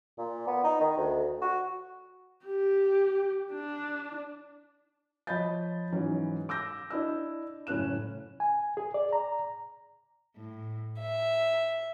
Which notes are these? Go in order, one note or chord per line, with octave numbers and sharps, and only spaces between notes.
A#2
B3
D#4
D#3
D2
F#4
G4
D4
F3 C#5 D#5 B5 G6 A6
G#2 E3 F#3 C#4
D6 E6 G6 A#6
D4 E4 D#5 E6
F#1 A2 C#4 F#6 E7
G#5
G#4
D5
A#5
A2
E5